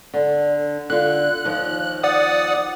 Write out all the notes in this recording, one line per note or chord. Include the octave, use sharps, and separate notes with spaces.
D3
D3 F4 F#6
D#2 F3
D5 F#5 D#6